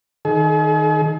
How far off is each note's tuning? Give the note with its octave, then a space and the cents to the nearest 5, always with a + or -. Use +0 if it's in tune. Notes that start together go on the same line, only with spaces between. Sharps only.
D#3 +0 G#4 +45